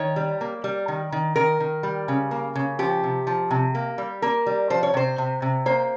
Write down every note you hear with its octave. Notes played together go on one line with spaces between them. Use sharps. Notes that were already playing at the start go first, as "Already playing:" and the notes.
Already playing: D#3 C#5
G3
A#3
G3
D#3
D#3
D#3 A#4
D#3
G3
C#3
A#3
C#3
F3 G4
C3
F3
C3
A#3
G3
A#3 A#4
G3
F3 C5
C#5
C3 C5
C3
C3
A#3 C5